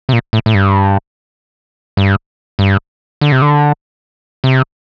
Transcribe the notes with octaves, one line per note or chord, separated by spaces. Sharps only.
C3
A#2
A2
A2
G2
G2
G2
D3
C3
D3
C3